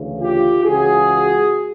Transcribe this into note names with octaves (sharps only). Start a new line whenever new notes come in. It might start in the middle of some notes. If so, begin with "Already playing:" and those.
Already playing: D2 C#3 E3
F4 G4
C#2 C#3 E3 F#4 G#4